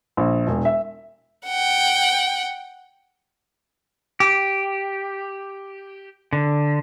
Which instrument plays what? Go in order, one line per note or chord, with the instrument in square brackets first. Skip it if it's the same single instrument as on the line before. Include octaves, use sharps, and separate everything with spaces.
[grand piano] A#1
E1
E5
[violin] F#5 G5
[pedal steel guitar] G4
D3